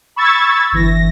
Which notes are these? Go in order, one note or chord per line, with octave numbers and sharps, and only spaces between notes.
B5 C#6 E6 G#6 A6
G1 E3 A#6